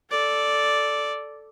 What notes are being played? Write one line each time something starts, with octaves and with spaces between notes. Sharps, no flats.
A4 D5